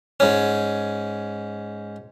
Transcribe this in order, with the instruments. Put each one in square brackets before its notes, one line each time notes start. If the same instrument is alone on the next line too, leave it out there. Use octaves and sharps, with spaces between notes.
[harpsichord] G#2 C#4